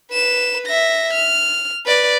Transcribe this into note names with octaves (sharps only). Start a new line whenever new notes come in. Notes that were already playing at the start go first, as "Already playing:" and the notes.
B4 E7
E5 A#6
F6
B4 D5